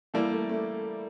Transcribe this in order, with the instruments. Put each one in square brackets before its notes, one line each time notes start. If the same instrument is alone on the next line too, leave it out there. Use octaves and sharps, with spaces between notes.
[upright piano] E3 [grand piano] G3 A#3 E4 A4 D5
[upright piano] A3
A3